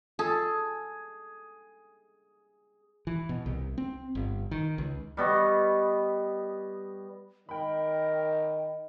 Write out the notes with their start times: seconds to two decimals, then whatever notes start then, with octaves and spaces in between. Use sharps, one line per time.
0.19 G#4 A4
3.07 E3
3.29 B2
3.46 C2
3.78 C4
4.15 G1
4.51 D#3
4.78 C#2
5.17 G3 B3 D#5 C#6
7.49 D#3 A#4 D#5 G5 B5